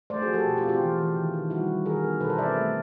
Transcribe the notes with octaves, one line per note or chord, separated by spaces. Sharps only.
A3 C5 D5
F#4 G#4
F3
G4 A4
B2
F4 G4
C4
F4 G4
E3
E3
D#3
D#3
G3 E4 F#4
G3
D#3 G#4 A#4
B3
B2 A4 B4
A#4 C5
C4 D5 E5
A3